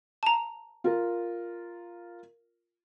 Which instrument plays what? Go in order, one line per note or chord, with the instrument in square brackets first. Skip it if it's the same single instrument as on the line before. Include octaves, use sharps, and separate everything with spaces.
[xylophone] A5 A#5
[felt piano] F4 A#4